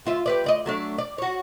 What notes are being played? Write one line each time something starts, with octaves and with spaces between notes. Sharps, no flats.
D2 F4 E5
G4 B4 D5
D2 D5 D#5
F#3 A3 D4
D5
F#4 C#5